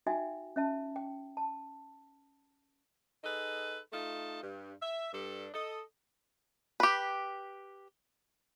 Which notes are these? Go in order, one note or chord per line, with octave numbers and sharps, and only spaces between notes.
D#4 F#4 E5 G5 G#5
C#4 E5 A5
G5
A5
D#4 G#4 A4 B4
A3 D#4 F4 A5
G2
E5
G2 G3 D4 A4
A4 D#5
G4 B4